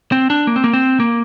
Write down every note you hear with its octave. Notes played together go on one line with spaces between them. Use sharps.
C4
D4
A#3
C4
A#3
C4
A#3